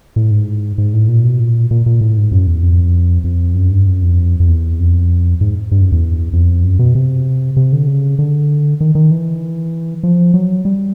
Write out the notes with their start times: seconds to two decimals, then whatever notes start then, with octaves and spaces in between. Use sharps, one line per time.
0.16 A2
0.31 G#2
0.78 G#2
0.94 A2
1.08 A#2
1.24 B2
1.40 A#2
1.71 A#2
1.86 A#2
2.01 A2
2.17 G#2
2.32 F#2
2.47 E2
2.63 F2
3.24 F2
3.55 F#2
3.71 G2
3.86 F#2
4.02 F2
4.40 F2
4.48 E2
4.79 F2
5.41 G#2
5.71 G2
5.81 F#2
5.92 E2
6.33 F2
6.64 F#2
6.79 B2
6.95 C3
7.57 C3
7.72 D3
7.87 C#3
8.19 D3
8.81 D#3
8.95 D#3
9.11 E3
10.03 F3
10.34 F#3
10.65 G3